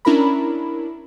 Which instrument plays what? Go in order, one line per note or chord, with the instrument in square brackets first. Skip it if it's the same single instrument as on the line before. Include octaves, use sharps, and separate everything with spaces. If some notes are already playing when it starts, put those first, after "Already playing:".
[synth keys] C#4 D4 E4 A#4 A#5 B5